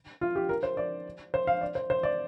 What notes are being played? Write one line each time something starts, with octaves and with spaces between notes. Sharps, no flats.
F4
G4
A#4
C5
D5
C5
F5
D5
C5
C5
D5